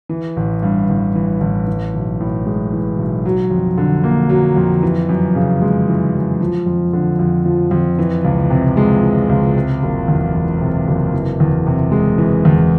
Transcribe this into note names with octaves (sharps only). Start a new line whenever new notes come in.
E3
A1
G2
A1
E3
A1
E3
B1
A2
G#3
E3
B1
F#3
F2
D3
A#3
F#3
F2
E3
F#2
C#3
G#3
E3
F#2
F3
F2
D3
F2
F3
F2
E3
C#2
C3
G#3
E3
C#2
C3
F#1
E2
E3
C3
F#1
E3
E2
C3
G#3
E3
E2